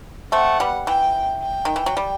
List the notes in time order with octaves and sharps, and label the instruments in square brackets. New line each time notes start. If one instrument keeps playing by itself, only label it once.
[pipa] A3 C4 [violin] F#5
[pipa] G3 B3
[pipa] E3 [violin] G5
[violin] G5
[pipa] D#3
E3
F#3
G3